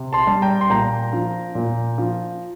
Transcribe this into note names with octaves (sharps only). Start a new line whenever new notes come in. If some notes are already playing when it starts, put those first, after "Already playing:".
Already playing: C3
A5 C6
G3
G5 A#5
C6
A#2 G5 A#5
F3
A#2
F3